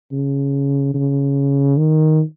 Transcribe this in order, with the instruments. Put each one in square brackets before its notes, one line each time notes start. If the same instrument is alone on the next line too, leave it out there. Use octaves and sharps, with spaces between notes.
[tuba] C#3
C#3
D#3